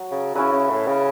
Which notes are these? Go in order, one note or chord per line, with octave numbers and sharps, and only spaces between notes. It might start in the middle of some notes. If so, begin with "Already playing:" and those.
Already playing: F#3 F#4
C#3
C#3 C#4 E4 B4 E5
C#3
A2
C#3